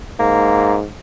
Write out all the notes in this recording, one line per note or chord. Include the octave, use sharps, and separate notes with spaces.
G#2 A#3